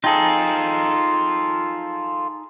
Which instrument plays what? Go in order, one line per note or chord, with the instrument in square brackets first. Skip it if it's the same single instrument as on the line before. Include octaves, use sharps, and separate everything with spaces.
[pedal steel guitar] D#4 G#4 [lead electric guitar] F4 A4 [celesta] G5 A5